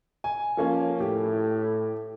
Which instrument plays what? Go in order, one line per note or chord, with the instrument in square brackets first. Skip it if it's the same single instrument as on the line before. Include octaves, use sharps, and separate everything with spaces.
[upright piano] G#5
F3 A#3 C#4
[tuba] A2 [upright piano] G4